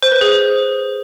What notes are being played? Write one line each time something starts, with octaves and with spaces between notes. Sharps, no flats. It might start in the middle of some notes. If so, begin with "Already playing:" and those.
C5
B4
G#4